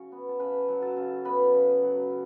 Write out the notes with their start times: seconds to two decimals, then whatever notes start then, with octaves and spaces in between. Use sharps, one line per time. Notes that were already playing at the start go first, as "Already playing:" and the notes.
Already playing: C#3 F#3 C#5
0.12 B3
0.29 A5
0.40 C#3 B4 B5
0.69 F#3
0.82 A4 A5
0.97 C#3
1.25 B3 B4 B5
1.54 C#3
1.82 F#3
2.10 C#3